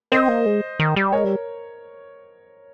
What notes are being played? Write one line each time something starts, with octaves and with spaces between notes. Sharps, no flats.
C4 C5 D#5
A#3
G#3
D#3
G3
G#3 A#4 C#5
G3